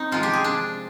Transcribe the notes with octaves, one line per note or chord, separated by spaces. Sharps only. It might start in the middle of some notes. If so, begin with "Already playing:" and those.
Already playing: C4 D#4
C3 F3 G#3 F4
G4
G#4
D4